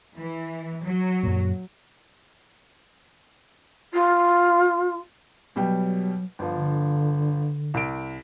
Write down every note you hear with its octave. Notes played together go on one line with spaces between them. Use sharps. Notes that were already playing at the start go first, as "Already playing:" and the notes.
E3
F#3
F#2 A#2
F4
B2 F#3 G3 G5
G1 F3
D3
C2 D7